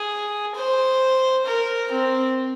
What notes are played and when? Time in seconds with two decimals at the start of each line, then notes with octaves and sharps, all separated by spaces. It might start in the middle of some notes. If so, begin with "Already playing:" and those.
Already playing: G#4
0.55 C5
1.46 A#4
1.91 C4